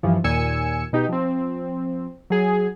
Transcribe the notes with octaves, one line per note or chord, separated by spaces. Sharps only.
G2 E3 F3
D#2 A#2 G#5 E6 C#7
B2 D#4 G4
F3 C4
F#3 G#4